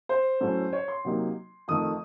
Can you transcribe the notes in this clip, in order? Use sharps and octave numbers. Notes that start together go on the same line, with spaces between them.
C5
A2 F#3 A3 C#4
C#5
C6
C3 F#3 A#3 D#4
F2 D#3 A3 D#6